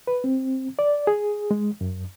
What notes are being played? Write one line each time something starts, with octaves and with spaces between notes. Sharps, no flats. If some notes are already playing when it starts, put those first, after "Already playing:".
B4
C4
D5
G#4
G#3
F#2